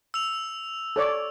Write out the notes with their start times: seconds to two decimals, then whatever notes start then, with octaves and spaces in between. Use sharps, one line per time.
0.14 E6 F7
0.96 A4 C#5 D5